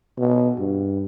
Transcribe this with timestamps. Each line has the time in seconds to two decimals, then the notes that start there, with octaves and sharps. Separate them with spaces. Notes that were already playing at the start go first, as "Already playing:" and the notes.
0.19 B2
0.58 G2